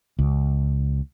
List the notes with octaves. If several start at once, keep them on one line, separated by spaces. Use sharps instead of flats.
C#2